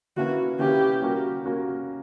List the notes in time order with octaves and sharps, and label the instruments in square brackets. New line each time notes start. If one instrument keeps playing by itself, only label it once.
[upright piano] D3 A#3 C#4 E4 B4 [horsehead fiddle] F#4
[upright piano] D3 A#3 C#4 E4 B4 [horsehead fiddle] G4
[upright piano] G3 A#3 C#4 F#4 A#4
A#3 C#4 F#4 A#4